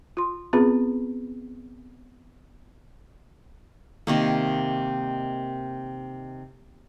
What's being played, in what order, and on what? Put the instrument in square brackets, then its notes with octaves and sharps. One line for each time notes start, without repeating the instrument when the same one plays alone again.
[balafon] F4 C6
B3 C4 F4 G#4 B4 B5
[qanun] C3 D#3 A#3